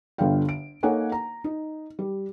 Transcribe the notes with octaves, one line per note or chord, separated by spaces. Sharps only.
G1 D3 D4 F4 F5 G5
D7
A#3 D#4 A4 C#5 F#5 G#5
A#5
D#4
G3